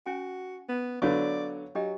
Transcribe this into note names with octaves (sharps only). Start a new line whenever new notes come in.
C#4 F#4 G#5
B3
D3 F#3 B3 C#5 D5 F5 C#6
F#3 D4 G4 D#5